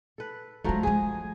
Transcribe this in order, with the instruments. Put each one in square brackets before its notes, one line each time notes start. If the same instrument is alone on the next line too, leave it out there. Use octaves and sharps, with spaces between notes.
[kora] A4 B4
[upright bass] D#3 G#3 [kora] F3 F#3 A3 [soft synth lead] A#5
[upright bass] G3 G#3 [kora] G#4 [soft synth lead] G#5